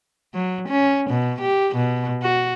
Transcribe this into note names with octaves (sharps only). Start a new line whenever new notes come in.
F#3
C#4
B2
G4
B2
F#4